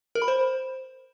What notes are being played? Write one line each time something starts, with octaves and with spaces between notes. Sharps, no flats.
A#4
B5
C5